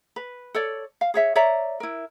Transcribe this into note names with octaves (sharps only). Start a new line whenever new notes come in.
B4
A4 C#5 D5
F5
G#4 C#5 E5
C#5 D5 E5 A#5
E4 A#4